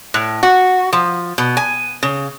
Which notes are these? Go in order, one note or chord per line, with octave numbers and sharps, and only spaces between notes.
A2
F#4
F3
B2
G#5
C#3